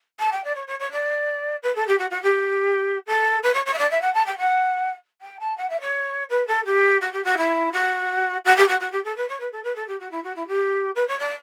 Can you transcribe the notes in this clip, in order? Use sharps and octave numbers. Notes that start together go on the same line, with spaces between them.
A5
G5
D5
C#5
C#5
C#5
D5
B4
A4
G4
F#4
F#4
G4
A4
B4
C#5
C#5
E5
D5
E5
F#5
A5
G5
F#5
G5
A5
F#5
E5
C#5
B4
A4
G4
F#4
G4
F#4
E4
F#4
F#4
G4
F#4
F#4
G4
A4
B4
C#5
B4
A4
B4
A4
G4
F#4
E4
F#4
E4
G4
B4
C#5
D5